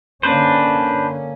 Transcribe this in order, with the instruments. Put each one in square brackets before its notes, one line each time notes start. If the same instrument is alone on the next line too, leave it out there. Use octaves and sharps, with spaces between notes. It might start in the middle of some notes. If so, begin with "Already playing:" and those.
[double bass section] D3 A#3 C#4 [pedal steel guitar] D4 B4 C5